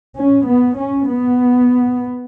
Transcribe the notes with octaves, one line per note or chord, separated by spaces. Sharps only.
C#4
B3
C#4
B3